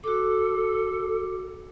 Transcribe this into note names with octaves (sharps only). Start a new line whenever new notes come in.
F#4 A4 D6